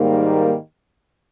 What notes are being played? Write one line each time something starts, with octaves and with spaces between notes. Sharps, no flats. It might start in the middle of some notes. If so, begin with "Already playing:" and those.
Already playing: G#2 D#3 G3 A#3